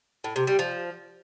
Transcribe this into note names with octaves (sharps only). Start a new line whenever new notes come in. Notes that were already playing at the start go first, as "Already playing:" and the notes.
A2
C3
G3
F3